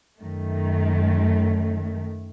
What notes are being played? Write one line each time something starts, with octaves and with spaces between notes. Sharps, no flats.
F#2 D#3 A3